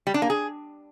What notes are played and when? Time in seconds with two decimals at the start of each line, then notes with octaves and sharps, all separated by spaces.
0.07 G3
0.14 D4
0.22 A#3
0.30 G#4